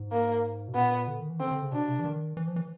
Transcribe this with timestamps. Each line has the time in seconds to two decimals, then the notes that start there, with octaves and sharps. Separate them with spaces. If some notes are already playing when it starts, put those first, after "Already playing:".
Already playing: G#2
0.12 A#3
0.68 B2
0.75 A#2 B3
1.08 D3
1.19 D#3
1.30 E3
1.40 D3 C4
1.51 D3
1.62 C#3
1.72 B2 D4
1.88 C3
1.99 E3
2.05 D#3
2.37 E3
2.47 F3
2.56 E3